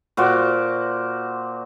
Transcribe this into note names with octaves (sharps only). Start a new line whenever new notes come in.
A#2 F#4 C5 D6